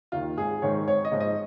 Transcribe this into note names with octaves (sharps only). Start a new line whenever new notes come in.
D#2 D#3 F4
G#1 G#4
G#2 D#3 C#5
G#1 C#5
D#5
G#2 F3
D#5